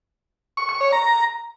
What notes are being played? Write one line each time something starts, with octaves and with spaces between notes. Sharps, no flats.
C#6
C#6
C#5
A#5